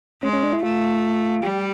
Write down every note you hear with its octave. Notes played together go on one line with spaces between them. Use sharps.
G#3 C#4
C#4
D4
E4
A3 F4
G3 G4